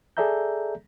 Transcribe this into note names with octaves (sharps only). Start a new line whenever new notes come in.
G#4 A4 D5 E5 A#5 G6